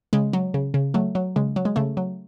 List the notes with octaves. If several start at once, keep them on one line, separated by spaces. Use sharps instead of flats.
C#3 G#3
F#3
C#3
C#3
F#3 A3
F#3
C#3 G#3
F#3
G#3
C#3 A3
F#3